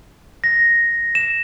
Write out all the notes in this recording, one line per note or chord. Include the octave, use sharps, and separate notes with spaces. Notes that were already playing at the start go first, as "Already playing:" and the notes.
A#6
E7